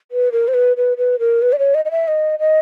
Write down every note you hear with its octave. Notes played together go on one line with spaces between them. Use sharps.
B4
A#4
C5
B4
B4
B4
A#4
B4
D5
C#5
D#5
D#5
E5
D#5
D#5